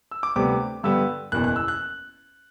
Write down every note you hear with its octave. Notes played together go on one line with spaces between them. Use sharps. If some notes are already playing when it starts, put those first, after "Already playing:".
E6
D6
D2 C3 G3 B3 D6
G2 D3 G3 B3 E6
F#1 E2 B2 F#6
F#6
E6
F#6